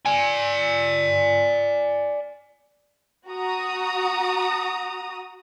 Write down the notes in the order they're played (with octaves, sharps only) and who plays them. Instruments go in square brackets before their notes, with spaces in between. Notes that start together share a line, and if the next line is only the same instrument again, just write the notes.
[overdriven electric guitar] D5 G#5
[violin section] F#4 A#5 D#6